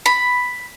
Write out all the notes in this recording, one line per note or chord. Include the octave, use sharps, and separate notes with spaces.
B5